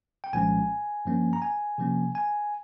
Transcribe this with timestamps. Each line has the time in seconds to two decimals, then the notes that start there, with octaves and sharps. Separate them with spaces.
0.24 G5
0.33 C2 A#2 F3 G#3 C#4 G#5
1.05 G2 F3 A#3 C#4
1.33 A#5
1.42 G#5
1.78 C3 F3 A#3 C#4
2.15 G#5